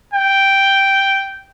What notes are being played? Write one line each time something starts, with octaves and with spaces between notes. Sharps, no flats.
G5